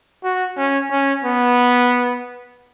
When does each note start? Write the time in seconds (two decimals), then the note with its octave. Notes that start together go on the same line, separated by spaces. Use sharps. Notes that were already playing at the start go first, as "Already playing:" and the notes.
0.24 F#4
0.57 C#4
0.91 C#4
1.24 B3